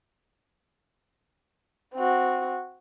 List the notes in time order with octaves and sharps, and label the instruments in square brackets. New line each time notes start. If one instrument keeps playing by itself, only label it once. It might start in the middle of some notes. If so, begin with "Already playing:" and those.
[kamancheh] C4 F#4